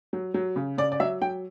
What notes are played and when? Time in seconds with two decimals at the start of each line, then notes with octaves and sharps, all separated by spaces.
0.13 F#3
0.34 F#3
0.56 C#3
0.78 C#3 D5
0.92 D5
1.00 F#3 E5
1.22 F#3 G5